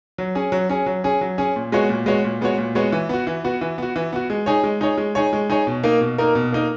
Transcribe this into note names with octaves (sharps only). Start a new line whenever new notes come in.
F#3
C#4 G#4
F#3
C#4 G#4
F#3
C#4 G#4
F#3
C#4 G#4
A#2
G#3 B3 F#4 C#5
A#2
G#3 B3 F#4 C#5
A#2
G#3 B3 F#4 C#5
A#2
G#3 B3 F#4 C#5
E3
B3 F#4
E3
B3 F#4
E3
B3 F#4
E3
B3 F#4
G#3
D#4 G#4 C#5
G#3
D#4 G#4 C#5
G#3
D#4 G#4 C#5
G#3
D#4 G#4 C#5
B2
A#3 D#4 A#4
B2
A#3 D#4 A#4
B2
A#3 D#4 A#4